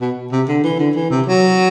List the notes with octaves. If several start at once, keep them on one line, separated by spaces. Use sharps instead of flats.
B2
C3
D3
E3
D3
E3
C3
F#3